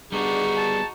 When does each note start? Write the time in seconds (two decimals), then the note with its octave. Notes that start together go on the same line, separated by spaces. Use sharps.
0.12 G3 B3 D4 D#4 F#4 G#4
0.57 A5